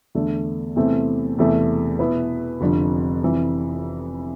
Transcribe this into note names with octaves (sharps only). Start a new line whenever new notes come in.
E2 D3 A3
E2 C3 E3 A3 C4
E1 E2 C3 E3 A3
B2 B3 E4 B4
F1 F2 D3 F3
F1 F2 E3